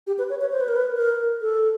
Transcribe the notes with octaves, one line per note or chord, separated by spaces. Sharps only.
G4
B4
C#5
C#5
C5
B4
A#4
B4
A#4
A4